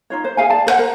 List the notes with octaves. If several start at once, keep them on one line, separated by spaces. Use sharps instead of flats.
D#4 F4 C#5
C5
G#4 E5 F5 G#5
D5 A5
A4 C5 F#5
A#4